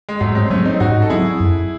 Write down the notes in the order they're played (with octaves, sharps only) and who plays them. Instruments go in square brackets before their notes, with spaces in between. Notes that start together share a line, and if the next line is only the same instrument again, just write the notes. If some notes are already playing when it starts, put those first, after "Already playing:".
[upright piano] G#3
[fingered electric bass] G#2 [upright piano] F#3 A3
[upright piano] G#3 C4
[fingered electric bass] F#3 C4 [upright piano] A3 C#4
[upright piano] C4 D#4
[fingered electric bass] G#2 [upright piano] D#4 F#4
[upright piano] A4
[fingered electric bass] F#3 C4 [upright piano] E4 G#4
[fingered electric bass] F#2